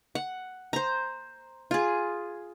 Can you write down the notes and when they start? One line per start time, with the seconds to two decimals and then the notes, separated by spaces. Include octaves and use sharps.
0.15 F#5
0.73 C5 A#5
1.71 F4 G#4